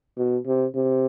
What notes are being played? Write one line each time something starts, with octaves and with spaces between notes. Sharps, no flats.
B2
C3
C3